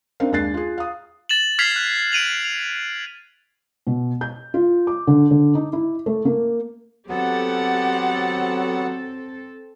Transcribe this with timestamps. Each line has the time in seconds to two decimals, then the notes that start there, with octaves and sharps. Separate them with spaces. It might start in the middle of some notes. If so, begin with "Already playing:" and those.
0.20 C4 D4 D#4 A#4 F5
0.32 D#2 G#3 D4 F#6 A6 C7
0.54 F4 G#4
0.78 F5 D#6
1.29 A6 E7 F#7
1.59 F6 G#6 B6 C7 F7
1.76 F#6
2.12 D7 D#7 F7 F#7
2.45 F7
3.87 B2
4.21 G6
4.54 F4
4.87 D6
5.07 D3
5.31 D3
5.55 D#4
5.73 E4
6.06 A3
6.25 A#3
7.09 F#3 B3 C4 G4 A4 F#5